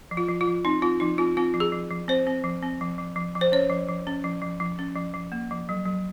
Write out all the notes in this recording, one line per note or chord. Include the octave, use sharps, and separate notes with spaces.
F3
F4
F3
F4
F3
C4 D#4
C4 F4
F3 D#4
C4 F4
C4 F4
F3
G#4
F3
F3
C4 C5
C4
F3
C4
F3
F3
F3
F3
C5
C#4 C#5
F3
F3
C#4
F3
F3
F3
C#4
F3
F3
A#3
F3
F#3
F#3